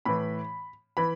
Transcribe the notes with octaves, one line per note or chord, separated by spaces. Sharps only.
A2 E3 B5
E3 B5